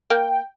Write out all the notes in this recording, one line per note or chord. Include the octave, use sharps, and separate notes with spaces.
A#3 G5